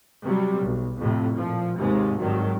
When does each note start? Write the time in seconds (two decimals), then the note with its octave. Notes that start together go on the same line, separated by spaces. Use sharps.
0.24 C3 F#3 G3
0.64 B1
1.00 F2 A2 C3
1.36 A#2 F3
1.77 D#2 G#2 C3 G#3
2.20 G#1 G2 D#3 F#3